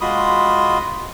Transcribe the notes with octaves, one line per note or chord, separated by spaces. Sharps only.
G#3 F4 F#4 B5 C6 D#6